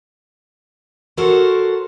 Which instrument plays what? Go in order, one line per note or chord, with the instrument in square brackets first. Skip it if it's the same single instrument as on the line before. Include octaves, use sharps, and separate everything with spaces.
[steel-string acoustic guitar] F#4 A4 A#4 C5 C#5